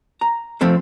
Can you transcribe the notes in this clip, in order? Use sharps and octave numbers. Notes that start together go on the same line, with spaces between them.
A#5
F3 A3 C4 A4